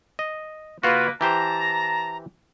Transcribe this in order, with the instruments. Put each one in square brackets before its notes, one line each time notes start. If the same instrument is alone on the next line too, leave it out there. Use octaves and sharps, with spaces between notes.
[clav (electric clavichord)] D#5
[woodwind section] C#3 A#3 B4 [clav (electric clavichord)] F4 F#4
[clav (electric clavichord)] E3 G4 C5 [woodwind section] A5 A#5